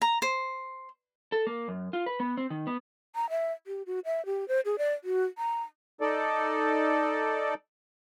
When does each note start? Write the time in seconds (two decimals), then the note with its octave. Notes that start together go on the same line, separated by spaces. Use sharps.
0.02 A#5
0.22 C5
1.32 A4
1.47 A#3
1.68 F#2
1.93 F4
2.06 B4
2.20 B3
2.37 C4
2.50 D#3
2.67 B3
3.15 A#5
3.30 E5
3.67 G4
3.86 F#4
4.05 E5
4.26 G4
4.48 C5
4.65 G#4
4.78 D5
5.04 F#4
5.38 A#5
6.01 D#4 A4 D5